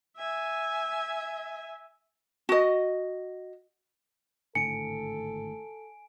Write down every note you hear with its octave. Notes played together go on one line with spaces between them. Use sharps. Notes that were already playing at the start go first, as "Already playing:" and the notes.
E5 G#5
F#4 D#5
G#1 A2 D3 A4 G#5 C#7 D7